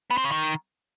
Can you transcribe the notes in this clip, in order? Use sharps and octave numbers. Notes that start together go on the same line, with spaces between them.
B3
C4
C#3
D#3